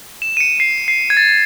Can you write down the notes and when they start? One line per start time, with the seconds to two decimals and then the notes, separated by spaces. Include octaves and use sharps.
0.22 E7
0.37 D#7
0.40 C#7
0.60 C7
0.88 C7
1.10 G#6
1.17 A6